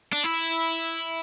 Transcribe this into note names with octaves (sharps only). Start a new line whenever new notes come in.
D4
E4